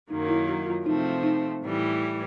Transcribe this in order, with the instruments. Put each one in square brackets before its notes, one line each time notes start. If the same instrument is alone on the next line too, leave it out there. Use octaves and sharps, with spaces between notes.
[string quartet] F#2 D#3 F#3 A#3 [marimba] D#4
[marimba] E4
F#4
F4
[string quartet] C3 F3 A3 C4 [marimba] D#4
[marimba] D#4
[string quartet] A2 E3 G3